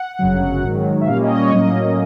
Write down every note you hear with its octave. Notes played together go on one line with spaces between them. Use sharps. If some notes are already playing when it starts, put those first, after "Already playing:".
Already playing: F#5
G1 F#2 C#3 F#3
G#2 D#3 F#3
E5
A#2 G3 A#3 C#4 F5
D#5
C#5
A2 F#3 A#3 C#4 D#5